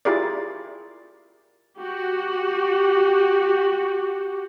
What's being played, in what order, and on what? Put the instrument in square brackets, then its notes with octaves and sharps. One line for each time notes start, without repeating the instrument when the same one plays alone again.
[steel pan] E4 F4 G4 G#4 A#4 D5
[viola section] F#4 G4